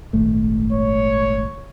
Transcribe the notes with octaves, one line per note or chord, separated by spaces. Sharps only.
D#1 G#1 A3
C#5